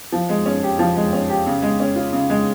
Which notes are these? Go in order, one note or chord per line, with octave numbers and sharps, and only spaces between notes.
F3
G#3
C#4
G4
F3
G#3
C#4
G4
C#3
G#3
C#4
F4
C#3
G#3